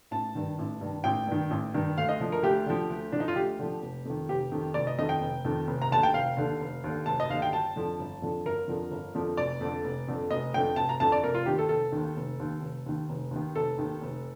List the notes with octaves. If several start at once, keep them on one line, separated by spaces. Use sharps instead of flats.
A1 A5
G2 D#3
A1
G2 D#3
A1 G5
G2 D#3
A1
G2 D#3
D2 F5
D#5
D3 F3
A#4
D2 G4
D3 F3
D2
D3 F3 D4
D#4
F4
D2 G4
D3 F3
F1
F2 D#3
F1 G4
F2 D#3
F1 D5
D#5
F2 D#3 D#5
G5
F1
F2 D#3
F1
A#5
D#2 D3 A5
G5
F1 F5
D#2 D3
F1
D#2 D3
F1 A5
D#5
D#2 D3 F5
G5
G1 A5
F2 D3 F3
G1
F2 D3 F3
G1 A#4
F2 D3 F3
G1
F2 D3 F3
F1 D5
F2 D3
F1
F2 D3
F1 D#5
F2 D3 G5
F1 A5
A#5
F2 D3 A5
D5
F1 A#4
F4
D#2 D#3 G4
A4
F1 A4
D#2 D#3
F1
D#2 D#3
F1
D#2 D#3
F1
D#2 D#3
F1 A4
D#2 D#3
F1